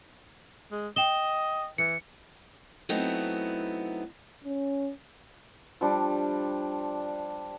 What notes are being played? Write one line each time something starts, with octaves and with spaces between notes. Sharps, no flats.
G#3
D#5 G5 E7 G7
E3 C#7
F#3 A3 B3 C4 D#4 E4
C#4
F3 G3 D4